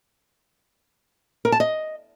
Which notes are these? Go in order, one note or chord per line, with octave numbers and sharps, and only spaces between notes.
A#4
A5
D#5